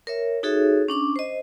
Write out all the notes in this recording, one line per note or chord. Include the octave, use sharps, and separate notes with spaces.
A#4 C#5 E5
D#4 F#4 G#4 A4 C#5 E5
C#4 D4 D6
C5 D#5